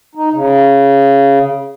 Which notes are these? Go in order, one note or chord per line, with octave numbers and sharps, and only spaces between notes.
D#4
C#3